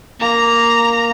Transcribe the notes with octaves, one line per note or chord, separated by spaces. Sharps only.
A#3 A#5